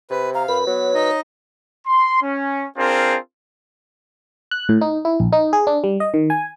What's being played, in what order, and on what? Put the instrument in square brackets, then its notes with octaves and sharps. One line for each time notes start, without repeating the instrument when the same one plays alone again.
[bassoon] C3 [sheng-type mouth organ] B4
[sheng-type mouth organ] F5 [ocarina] A#5
[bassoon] F#2 [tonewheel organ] B4 [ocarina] B5
[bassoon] F#3 [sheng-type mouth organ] B3 [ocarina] C#5
[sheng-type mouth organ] D#4 D#5
[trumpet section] C6
C#4
C4 D4 F4 G#4 A#4 C5
[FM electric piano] F#6
A2
D#4
E4
A#1
D#4
G#4
D4
G3
D#5
D#3
G#5